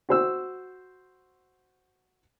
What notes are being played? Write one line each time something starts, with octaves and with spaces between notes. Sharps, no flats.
F#4 C5 E6